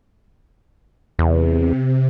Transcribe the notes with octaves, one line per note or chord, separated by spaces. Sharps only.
E2 C3